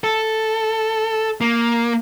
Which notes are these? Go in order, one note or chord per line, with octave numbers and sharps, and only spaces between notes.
A4
A#3